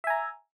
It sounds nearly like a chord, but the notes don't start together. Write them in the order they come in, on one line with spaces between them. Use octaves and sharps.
E5 G#5 A#5